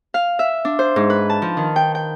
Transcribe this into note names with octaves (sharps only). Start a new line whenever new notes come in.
F5
E5
D4
C5
G#2
B4
A5
F3
D#3
G5
G5